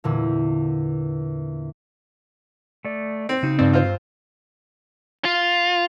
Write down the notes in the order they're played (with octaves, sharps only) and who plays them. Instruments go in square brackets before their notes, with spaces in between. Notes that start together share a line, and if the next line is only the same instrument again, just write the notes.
[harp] E2 A#2 D3
[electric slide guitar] A3 D5
[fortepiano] C4
[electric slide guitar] C#3 D#4 F#4
[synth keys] G2 G#3 C4 [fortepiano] D5
[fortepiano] F4 C5
[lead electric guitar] F4